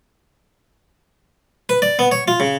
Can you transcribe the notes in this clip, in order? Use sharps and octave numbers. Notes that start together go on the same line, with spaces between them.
B4
D5
B3
C#5
F4
C#3